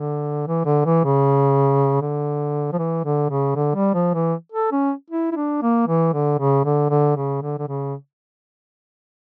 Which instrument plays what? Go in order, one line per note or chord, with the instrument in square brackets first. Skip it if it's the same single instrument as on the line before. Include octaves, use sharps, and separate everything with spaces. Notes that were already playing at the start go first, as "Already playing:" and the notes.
Already playing: [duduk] D3
E3
D3
E3
C#3
D3
F3
E3
D3
C#3
D3
G3
F3
E3
A4
C#4
E4
E4
D4
A#3
E3
D3
C#3
D3
D3
C#3
D3
D3
C#3